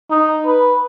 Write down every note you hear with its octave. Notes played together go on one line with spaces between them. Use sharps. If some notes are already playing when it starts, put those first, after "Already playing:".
D#4
B4